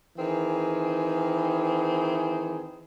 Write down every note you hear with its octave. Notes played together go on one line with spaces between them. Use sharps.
D#3 E3 C4 G#4